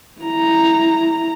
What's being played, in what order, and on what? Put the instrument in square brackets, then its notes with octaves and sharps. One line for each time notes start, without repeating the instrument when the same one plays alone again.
[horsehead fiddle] E4 A#5